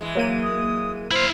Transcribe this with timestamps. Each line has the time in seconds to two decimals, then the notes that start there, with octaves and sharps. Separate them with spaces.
0.01 E3 G#3
0.15 F#3 A#3 D#7
0.43 D#6
1.11 E4 C5 F5